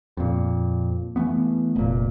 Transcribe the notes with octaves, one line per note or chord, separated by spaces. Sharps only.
F2 A#2
E3 F3 A3 B3
F1 A#2